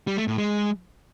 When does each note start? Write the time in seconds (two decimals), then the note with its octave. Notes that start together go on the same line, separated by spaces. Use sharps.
0.07 G3
0.17 A3
0.28 A2
0.38 G#3